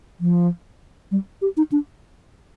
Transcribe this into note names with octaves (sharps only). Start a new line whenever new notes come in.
F3
G3
G4
D#4
D4